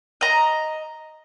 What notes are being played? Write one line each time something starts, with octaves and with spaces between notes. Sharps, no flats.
D#5 A#5